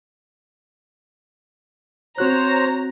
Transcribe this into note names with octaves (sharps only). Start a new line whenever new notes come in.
C4 F#4 C5 C#5 A#5 F#6